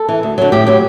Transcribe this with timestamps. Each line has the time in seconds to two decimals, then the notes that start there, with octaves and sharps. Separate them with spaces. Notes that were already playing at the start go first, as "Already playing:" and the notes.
Already playing: A4
0.09 E3
0.23 D2
0.38 D3 F#3
0.52 A2 G4
0.67 F#3 G4